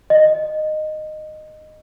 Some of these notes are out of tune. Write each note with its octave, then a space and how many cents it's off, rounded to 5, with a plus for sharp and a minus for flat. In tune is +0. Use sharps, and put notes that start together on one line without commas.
D#5 -15